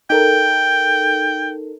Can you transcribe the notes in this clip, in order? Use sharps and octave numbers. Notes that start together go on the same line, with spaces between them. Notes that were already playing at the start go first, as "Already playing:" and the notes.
D#4 A4 A#4 G5